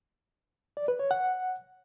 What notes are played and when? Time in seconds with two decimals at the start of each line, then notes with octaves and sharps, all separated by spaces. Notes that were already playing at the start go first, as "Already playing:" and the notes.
0.77 D5
0.88 B4
0.99 C#5
1.11 F#5